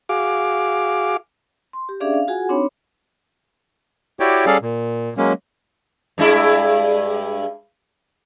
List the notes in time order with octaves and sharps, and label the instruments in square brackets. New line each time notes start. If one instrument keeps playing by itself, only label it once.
[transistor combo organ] F#4 G#4 F5 D6
[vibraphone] C6
G4
C#4 D4 G#4 D5 E5 F5
F5
F4 F#4 G#4 F#5 G#5
C4 D4 D#4 C#5 B5
[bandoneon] E4 F#4 G4 C#5 D5 G5
G3 C#4 G#4 A4 D5 F5
A#2
F#3 G#3 A#3 C#4
[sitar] G2 G#3 E4